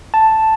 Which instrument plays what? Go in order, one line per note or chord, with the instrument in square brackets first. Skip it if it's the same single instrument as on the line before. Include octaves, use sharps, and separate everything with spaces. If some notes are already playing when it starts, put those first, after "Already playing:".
[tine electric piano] A5